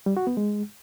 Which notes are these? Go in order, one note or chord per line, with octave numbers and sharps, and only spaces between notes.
G3
F#4
B3
G#3